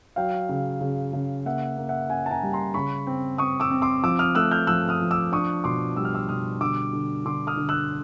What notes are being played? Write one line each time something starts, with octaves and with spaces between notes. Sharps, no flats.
F#3 F5 G5
C#3
C#3
C#3
A#3 E5 F#5
A#3
E5 F#5
C#4 F#5 G#5
A5
G#5 A#5
G3
A#5 C6
C#3 B5 C#6
C4
C4 C#6 D#6
D6 E6
C4
C6 D6
F3 D6 E6
D#6 F6
A3 E6 F#6
F6 G6
F3 E6 F#6
D#6 F6
F3
D6 E6
D4 C#6 D#6
B2 C6 D6
G3 E6
F6
D6 E6
B2 D#6 F6
D3 D6 E6
D3
D3 C6 D6
D#6 F6
D3
E6 F#6